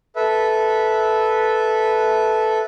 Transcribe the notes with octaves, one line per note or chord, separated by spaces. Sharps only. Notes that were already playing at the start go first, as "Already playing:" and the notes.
A4 B4 E5